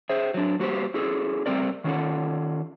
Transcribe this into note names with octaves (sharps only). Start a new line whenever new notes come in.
G#4 C5 E5
F#3 D4
G3 A#3 F#4 G4 B4 C5
C#4 E4 F#4 G#4 A4
G3 A3 C4 A#4 D5
D#3 F#3 C#4 F4 A4 F#5